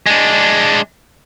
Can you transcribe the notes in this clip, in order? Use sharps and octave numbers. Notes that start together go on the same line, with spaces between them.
G#3 D4